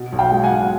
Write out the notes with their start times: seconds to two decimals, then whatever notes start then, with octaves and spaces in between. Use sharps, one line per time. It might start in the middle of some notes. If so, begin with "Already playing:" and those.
Already playing: B2
0.12 B1
0.19 F5 G5
0.31 G#3
0.44 F#5 G#5
0.50 B1
0.62 F#5